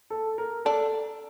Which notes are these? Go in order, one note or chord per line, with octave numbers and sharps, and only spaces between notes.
A4
A#4
D4 A4